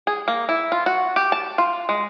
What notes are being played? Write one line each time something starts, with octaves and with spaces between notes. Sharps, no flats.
G#4
A#3
E4
F4
F#4
G4
A5
F4
G#3